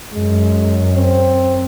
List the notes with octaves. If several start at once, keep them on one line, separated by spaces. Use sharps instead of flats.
F#2 G#3
C4